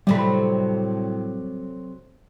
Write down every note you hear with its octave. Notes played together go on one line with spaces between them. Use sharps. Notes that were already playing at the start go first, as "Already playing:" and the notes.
A2 C3 F#3 G3 A3 B5